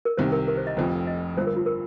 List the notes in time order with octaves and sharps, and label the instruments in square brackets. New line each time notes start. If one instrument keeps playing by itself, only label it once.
[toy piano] A#4
[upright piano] C2 C3 D#3 [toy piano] C5
[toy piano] A#4
A#4
C5
D#5
[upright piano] F1 F2 F3 [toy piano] C5
[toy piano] D#5
[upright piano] G1 G2 F3 [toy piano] C5
[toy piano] A#4
F4
A#4